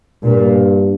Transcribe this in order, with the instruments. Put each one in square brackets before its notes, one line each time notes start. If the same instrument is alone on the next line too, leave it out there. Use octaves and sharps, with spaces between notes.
[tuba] G2 [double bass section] A#2